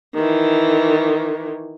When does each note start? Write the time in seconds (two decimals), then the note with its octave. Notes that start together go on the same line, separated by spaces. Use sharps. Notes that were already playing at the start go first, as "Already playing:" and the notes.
0.14 D#3 E3